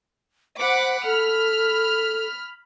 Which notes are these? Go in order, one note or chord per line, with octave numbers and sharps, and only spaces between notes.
C5 F#5 B5 D6
A4 B5 F6